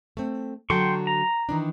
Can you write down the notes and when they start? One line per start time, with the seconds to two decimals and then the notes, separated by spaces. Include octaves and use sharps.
0.17 A3 C4
0.70 D3 F#3 A4 G5 C6 C#6
1.07 A#5
1.49 D#3 E3 D4